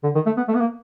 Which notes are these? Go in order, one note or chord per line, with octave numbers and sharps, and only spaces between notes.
D3
D#3
A3
B3
A3
B3
A#3